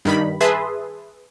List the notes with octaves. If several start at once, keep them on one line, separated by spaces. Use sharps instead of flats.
G2 D#3 B5
G#4 B4 E5 A5 C6 D#6